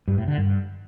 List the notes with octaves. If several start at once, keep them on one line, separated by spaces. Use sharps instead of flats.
G2
A2
D3
G2